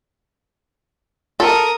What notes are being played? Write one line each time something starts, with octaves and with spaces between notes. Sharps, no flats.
A4 A#4 D#6